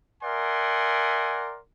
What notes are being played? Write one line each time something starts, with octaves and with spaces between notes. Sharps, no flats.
A#4 D5 E5 F#5 G#5 C6